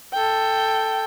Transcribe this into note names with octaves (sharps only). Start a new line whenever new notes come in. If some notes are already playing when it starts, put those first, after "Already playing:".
A4 G5